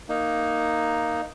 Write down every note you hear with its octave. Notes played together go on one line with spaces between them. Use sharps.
A#3 D#4